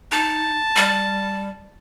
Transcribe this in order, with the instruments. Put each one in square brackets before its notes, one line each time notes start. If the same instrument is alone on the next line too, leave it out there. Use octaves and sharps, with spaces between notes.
[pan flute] D#4 [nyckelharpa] A5
[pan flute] G3